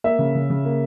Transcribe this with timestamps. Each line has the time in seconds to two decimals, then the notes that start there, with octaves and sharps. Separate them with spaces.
0.04 A#3 E5
0.19 C#3
0.35 C#3
0.50 C#3
0.65 A#3